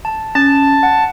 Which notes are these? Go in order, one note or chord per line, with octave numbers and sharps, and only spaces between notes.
A5
C#4 A5
F#5